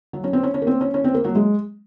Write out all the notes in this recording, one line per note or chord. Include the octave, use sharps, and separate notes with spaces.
F#3
C#4
C4
C#4
C#4
A#3
C4
C#4
C#4
C4
A#3
F#3
G#3